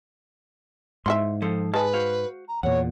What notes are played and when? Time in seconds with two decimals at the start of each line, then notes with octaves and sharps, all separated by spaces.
1.06 G#2 E3 F#4 E5 C6
1.42 F3 A4 C5
1.74 G#3 G#4 B4 A5
1.94 F#4 C5 F5
2.48 A#5
2.63 E2 A#2 C#5 F#5